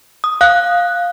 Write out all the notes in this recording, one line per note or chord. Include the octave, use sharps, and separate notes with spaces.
D#6
F5 D#6 F#6